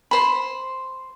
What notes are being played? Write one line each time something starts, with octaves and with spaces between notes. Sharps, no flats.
C5 B5